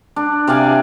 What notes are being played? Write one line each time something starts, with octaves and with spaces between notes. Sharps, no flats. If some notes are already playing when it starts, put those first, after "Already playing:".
D4
C3 D5 F5 G#5